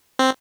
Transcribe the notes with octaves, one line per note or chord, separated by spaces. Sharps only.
C4